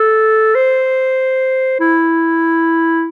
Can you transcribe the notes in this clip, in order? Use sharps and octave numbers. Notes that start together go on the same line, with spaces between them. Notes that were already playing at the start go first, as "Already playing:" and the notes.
Already playing: A4
C5
E4